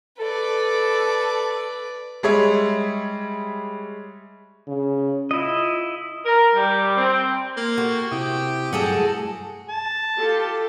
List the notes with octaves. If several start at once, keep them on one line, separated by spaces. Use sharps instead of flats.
A4 B4 D5
G3 G#3 G#4 C#5 E5
C#3
E4 F4 D#5
A#4
G3
C4
A#3
F#4 G4 A4
C3 E4 G4 D#6
G2 F#3 A3 F#4 G#4 A4
A5
F4 G4 A4